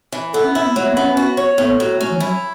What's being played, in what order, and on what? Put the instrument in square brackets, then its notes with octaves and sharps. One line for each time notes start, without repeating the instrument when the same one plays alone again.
[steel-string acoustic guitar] E3
[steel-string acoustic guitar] B3 [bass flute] A4
[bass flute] C#4
[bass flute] C#4 [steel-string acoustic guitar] E4
[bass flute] B3
[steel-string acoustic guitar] F#3 [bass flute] A3
[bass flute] B3
[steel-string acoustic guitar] B3 [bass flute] C#4
[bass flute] C#4
[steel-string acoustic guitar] F#4
C#5
[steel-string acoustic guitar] A2 [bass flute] B3
[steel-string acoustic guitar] F#3
[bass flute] A3 [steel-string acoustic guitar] C#4
[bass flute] E3
[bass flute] F#3 [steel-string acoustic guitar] E4